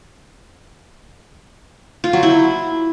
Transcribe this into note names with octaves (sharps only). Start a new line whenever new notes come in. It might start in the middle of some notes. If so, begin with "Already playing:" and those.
F4
F#3
E4